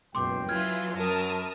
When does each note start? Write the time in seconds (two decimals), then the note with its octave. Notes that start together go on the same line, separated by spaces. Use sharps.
0.15 F#1 C#2 F#2 B2 G5 C6 D6
0.49 E3 F#3 F4 F6 G#6
0.95 F#2 A#4 A5 D#6